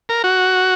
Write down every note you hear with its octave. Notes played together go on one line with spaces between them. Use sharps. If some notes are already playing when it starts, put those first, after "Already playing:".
A#4
F#4